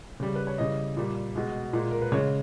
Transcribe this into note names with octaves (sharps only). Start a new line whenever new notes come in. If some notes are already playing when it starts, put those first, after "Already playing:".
C#3 G3
B4
C#5
C#3 E3 G3 D#5
A#2 G3
B2 G#3
A#2 G#3
A#4
B4
C#3 G#3 C#5